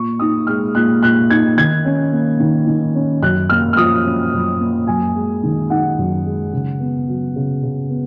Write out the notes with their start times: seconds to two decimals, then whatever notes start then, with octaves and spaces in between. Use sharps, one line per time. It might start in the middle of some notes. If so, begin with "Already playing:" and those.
Already playing: A#2 C#6
0.19 D#4 D#6
0.47 G#3 F6
0.75 A#2 F#6
1.02 A#2 F#6
1.30 D#4 G#6
1.57 D#3 G#6
1.85 C#4
2.12 A#3
2.40 D#3
2.67 D#3
2.95 C#4
3.22 F#2 F#6
3.49 A#3 F6
3.73 F6
3.77 F3 D#6
4.05 C#4
4.33 F#2
4.59 A#3
4.87 F#2 G#5
5.15 G#3
5.43 D#3
5.70 D#4 F#5
5.98 F#2
6.25 G#3
6.53 C#3
6.80 B3
7.08 F#3
7.36 C#3
7.63 C#3
7.90 B3